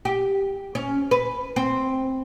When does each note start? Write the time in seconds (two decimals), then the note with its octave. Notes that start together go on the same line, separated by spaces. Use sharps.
0.05 G4
0.75 C#4
1.11 B4
1.56 C4